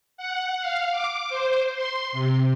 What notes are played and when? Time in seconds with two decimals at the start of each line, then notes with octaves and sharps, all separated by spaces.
0.17 F#5
0.60 F5
0.91 D6
1.29 C5
1.74 C6
2.12 C3